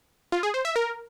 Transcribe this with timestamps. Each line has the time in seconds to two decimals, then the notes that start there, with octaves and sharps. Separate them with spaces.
0.32 F4
0.43 G#4
0.54 C5
0.65 E5
0.76 A#4